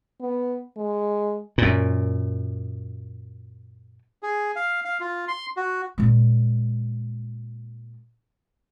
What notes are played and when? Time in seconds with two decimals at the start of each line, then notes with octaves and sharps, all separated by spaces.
0.21 B3
0.77 G#3
1.58 F#2 A#2
4.23 G#4
4.56 F5
4.85 F5
5.00 F4
5.28 C6
5.57 F#4
5.98 A#2 G#3